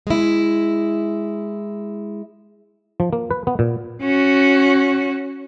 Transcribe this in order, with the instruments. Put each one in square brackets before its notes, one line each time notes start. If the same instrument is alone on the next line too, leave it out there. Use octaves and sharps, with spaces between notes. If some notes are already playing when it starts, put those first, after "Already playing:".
[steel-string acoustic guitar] G#3 E4
[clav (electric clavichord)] F3
A#3
B4
B3
A#2
[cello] C#4 F#4